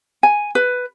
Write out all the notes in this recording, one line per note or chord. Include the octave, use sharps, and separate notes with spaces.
G#5
B4